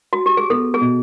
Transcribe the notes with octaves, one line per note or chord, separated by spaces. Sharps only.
F#4
G4
G#4
B3 A4
G#4
B2